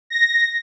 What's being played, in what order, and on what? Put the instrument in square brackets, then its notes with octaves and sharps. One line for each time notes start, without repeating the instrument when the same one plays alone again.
[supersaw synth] A#6